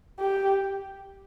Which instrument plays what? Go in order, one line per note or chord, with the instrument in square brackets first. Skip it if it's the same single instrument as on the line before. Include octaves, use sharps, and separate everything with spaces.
[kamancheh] G4